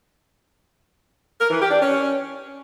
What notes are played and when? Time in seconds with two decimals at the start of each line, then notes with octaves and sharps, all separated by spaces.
1.40 A#4
1.51 E3
1.61 G4
1.71 D4
1.81 C#4